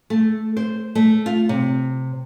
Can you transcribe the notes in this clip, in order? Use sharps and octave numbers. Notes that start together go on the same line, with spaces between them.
A3
C5
A3
F4
C3